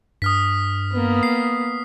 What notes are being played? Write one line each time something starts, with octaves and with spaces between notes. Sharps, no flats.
G2 D#6 F6 B6
A#3 B3
C7